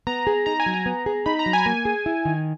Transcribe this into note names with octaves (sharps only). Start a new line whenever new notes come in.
B3 A#5
G#4
D#4 A#5
G#5
F#3
A#5
B3
G#4
D#4 B5
A#5
F#3
G#5
A#3
G#4
E4
D#3